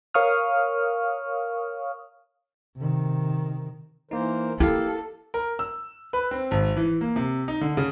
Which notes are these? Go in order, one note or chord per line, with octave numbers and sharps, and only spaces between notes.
A#4 C#5 F5 C#6 D#6 F6
C3 D#3
E3 A#3 D#4 A#4 C5
A#3 E4 G4 A4 F5
A#4
E6
B4
C4
G#1
E3
A#3
C3
D#4
D3
C#3